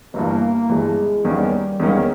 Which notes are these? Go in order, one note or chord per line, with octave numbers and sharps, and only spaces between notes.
G1 G2 E3 A#3
G1 G2 E3 G#3
E2 D#3 G3 A#3 C#4
E2 D#3 G#3 A#3 C#4